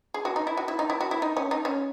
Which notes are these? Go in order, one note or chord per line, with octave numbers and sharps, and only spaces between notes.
G#4
F#4
D#4
E4
F#4
E4
D#4
E4
F#4
E4
D#4
C#4
D#4
C#4